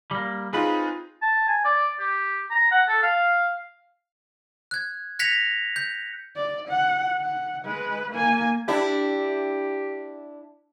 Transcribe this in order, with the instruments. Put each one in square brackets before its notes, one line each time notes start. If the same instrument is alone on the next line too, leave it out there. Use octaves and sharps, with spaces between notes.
[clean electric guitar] G3 A#3
[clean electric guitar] C4 B4 [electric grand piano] D#4 F4 G#4
[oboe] A5
G#5
D5
G4
A#5
F#5
A4
F5
[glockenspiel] F#6 G#6
F#6 G#6 A#6 B6 C#7 F7
G6
[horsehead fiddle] D5
F#5
F#5
G#3 B4
A#3 G#5
[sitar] D4 E4 [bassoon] G4